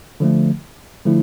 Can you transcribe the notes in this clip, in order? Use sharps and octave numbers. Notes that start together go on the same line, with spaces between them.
D3 F3 A3
D3 F3 A3 E4